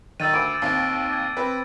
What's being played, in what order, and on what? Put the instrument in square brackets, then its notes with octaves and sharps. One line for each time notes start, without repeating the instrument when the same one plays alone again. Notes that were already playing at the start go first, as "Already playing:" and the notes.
[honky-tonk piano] D#3 D#4 [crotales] E6 A6 D#7
[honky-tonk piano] D2 [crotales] D6 G#6 D7
[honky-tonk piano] D#2 C4
[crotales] D6 G#6
[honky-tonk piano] C4 B4